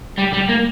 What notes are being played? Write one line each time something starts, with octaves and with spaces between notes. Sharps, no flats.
G3
G3
A#3